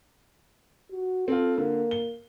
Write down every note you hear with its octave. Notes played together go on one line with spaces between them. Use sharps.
F#4
C4 F4 A4
D3 A#3
G7